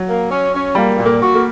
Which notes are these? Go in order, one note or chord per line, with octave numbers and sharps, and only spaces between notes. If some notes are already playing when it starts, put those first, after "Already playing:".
Already playing: F#3
A#3
C#4
C#4
G3 A#3
A#2
A#3
F#4
A#3